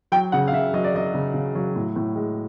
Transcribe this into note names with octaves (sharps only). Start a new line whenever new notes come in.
F#3 G5
C#3 F#5
F5
C#3 E5
F#3 D#5
D5
F#3 D#5
C#3
C#3
F#3
A2
A2
G#3